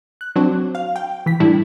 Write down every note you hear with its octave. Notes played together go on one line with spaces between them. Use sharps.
F#6
F#3 C4 D4 F#4 C5
F5
G5
E3 B6
A2 G3 D4 E4